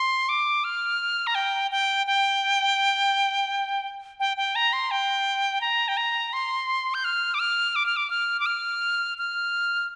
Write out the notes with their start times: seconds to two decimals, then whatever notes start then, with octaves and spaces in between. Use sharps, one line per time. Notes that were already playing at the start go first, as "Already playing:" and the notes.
Already playing: C6
0.29 D6
0.64 F6
1.27 A#5
1.35 G5
1.71 G5
2.07 G5
4.20 G5
4.37 G5
4.56 A#5
4.73 C6
4.91 G5
5.61 A#5
5.88 G5
5.97 A#5
6.33 C6
6.94 G6
7.04 F6
7.34 D6
7.39 F6
7.76 D6
7.86 F6
7.97 D6
8.10 F6
8.40 D6
8.46 F6
9.18 F6